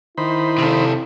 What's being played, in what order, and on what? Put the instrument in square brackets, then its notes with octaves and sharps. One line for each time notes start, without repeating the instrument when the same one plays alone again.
[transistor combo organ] D#3 C5 B5 [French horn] E4
[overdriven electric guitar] C3 A4